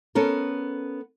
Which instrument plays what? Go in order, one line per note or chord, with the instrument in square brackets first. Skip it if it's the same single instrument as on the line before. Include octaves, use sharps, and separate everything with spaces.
[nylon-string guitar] B3 C#4 A4 A#4